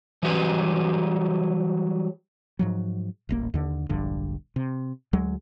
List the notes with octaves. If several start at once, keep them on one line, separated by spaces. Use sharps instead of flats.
E3 F#3 G3 G4 B4
G#2 F3 F#3
D#1 A1 A#3
D#2 D3
E1 A#1 G2 D3
C3
D2 F#3 G#3